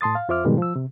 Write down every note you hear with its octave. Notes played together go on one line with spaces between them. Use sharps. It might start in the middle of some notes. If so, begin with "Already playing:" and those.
A2 A5 C6 D#6 A6
F5
F2 F4 C5 E5 D6 F6
G#2 B2 D#3 F3 G3 G#3
F3 E6
C3